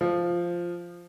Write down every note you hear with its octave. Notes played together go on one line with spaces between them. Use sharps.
F3